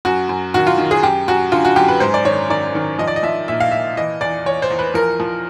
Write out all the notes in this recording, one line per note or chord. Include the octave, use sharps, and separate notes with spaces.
F#2 F#4
F#2
D#3 F#4
F4
D#3
G#4
F#2 G4
F#2 F#4
D3 F4
F#4
F#2 G4
B4
G#2 C5
D5
D#3 C#5
D#3 D5
D#3
F3 D#5
D5
D#5
F3 E5
A#2 E5
F5
A#2 E5
E3 D#5
E2 D5
E2 C#5
C5
E2
B4
F3 A#4
F3